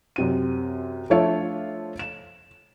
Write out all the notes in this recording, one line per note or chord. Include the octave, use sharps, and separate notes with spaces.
F#2 C3 D#7
F3 A3 D4 F4 C#5 E5
E7